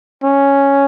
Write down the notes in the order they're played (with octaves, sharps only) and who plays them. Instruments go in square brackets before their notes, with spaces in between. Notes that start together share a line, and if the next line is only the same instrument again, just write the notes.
[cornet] C#4